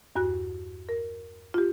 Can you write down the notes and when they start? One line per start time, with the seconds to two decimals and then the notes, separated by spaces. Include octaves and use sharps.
0.16 E2 G2 F#4 F#6
0.89 A#4
1.54 F4 G4